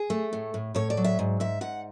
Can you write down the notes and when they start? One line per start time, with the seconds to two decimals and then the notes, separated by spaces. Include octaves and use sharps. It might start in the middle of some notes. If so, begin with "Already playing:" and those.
Already playing: G#4
0.10 A3
0.33 A2
0.54 A2
0.75 A2 C#5
0.90 D5
0.97 F#3
1.04 E5
1.19 G#2
1.40 G#2 E5
1.61 G#2 F#5